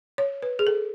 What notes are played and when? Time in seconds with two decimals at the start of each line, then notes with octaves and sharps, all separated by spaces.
0.18 C#5
0.42 B4
0.59 G#4
0.67 A4